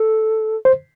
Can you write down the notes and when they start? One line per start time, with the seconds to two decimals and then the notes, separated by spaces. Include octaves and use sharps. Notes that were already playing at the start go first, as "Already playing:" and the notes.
Already playing: A4
0.65 C5